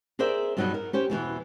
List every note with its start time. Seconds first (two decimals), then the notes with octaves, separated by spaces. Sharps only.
0.19 G#4 A#4 C5 D5 E5
0.57 G2 B2 F#3 B3 D#4 D#5
0.74 A#4
0.93 C#4 G4 C5
1.10 E2 B2 D#3 E3